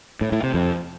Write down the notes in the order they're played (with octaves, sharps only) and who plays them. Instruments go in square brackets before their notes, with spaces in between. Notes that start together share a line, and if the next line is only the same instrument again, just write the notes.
[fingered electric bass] A2
A2
C3
F2